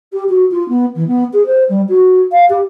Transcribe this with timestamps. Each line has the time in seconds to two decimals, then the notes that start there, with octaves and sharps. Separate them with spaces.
0.12 G4
0.28 F#4
0.51 F4
0.68 B3
0.95 E3
1.07 B3
1.33 G#4
1.46 C5
1.69 G3
1.88 F#4
2.32 F5
2.49 G4